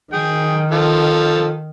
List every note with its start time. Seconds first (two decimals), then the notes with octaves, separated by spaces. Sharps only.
0.13 D#3 G#4 G5
0.72 F3 A4 F5